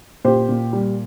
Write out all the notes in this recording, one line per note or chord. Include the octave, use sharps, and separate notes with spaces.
A#2 G4 C5
A#2
G3